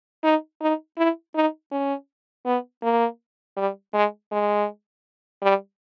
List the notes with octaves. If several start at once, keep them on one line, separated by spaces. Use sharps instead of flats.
D#4
D#4
E4
D#4
C#4
B3
A#3
G3
G#3
G#3
G3